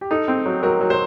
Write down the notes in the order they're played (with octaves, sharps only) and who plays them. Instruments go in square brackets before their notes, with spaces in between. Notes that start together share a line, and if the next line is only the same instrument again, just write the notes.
[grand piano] G4
[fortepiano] D#4 [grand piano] A4
[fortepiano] C4
F#3
[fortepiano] F#3 [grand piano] A#4
[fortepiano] F#3
[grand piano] C5